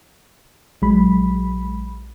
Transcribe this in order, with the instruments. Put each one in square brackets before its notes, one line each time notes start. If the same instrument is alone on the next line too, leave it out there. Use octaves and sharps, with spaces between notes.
[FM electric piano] A#1 F#3 G#3 B5